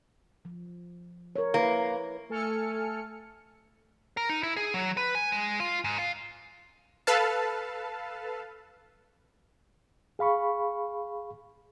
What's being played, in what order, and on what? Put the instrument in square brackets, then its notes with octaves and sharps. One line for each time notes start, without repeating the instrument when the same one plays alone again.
[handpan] F3
A#4 C#5
[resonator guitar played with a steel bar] A#3 [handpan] E4 B4
[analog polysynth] A3 A4 G#5 F6 C#7
[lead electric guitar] A#4
D#4
E4
G#4
F#3
B4
G#5
G#3
F4
G#2
F4
[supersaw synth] A4 B4 F5 A5
[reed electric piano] G#4 F5 B5 C#6